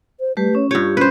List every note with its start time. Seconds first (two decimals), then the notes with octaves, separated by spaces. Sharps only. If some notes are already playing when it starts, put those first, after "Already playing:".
0.20 C5
0.37 G3 A3 G4 B4
0.55 C#4 C#5
0.71 G2 F4 G4 C#5
0.97 C#4 B4 C5